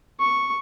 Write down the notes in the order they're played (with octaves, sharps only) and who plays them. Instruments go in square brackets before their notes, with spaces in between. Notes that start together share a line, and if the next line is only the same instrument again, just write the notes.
[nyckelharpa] C#6